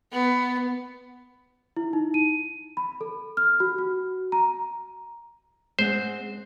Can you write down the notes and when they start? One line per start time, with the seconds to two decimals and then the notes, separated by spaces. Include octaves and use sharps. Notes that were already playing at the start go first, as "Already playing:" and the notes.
0.12 B3
1.77 E4
1.93 D#4
2.14 D#7
2.77 B5
3.01 A4
3.37 F6
3.60 F#4
3.78 F#4
4.32 A#5
5.79 G#3 C4 C5 F#5